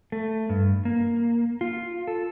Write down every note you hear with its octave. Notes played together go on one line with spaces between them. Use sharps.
A3
G2
A#3
F4
A4